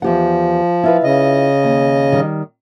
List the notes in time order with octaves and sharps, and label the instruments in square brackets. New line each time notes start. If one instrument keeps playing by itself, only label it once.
[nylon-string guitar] E2 G4 F#5 [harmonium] F3
[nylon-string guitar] E4 F4 B4
[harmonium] C#3 D#5
[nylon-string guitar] D#2
D#3 G3